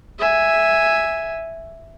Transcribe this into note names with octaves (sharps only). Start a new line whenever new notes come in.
E5 G#5